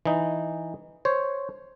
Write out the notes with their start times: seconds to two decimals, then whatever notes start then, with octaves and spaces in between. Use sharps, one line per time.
0.06 E3 D#4
1.05 C5 C#5